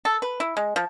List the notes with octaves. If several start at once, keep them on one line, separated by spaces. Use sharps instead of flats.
A4
B4
E4
G#3
F3